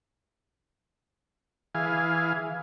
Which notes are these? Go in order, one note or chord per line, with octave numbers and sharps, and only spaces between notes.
E3 G#4 F5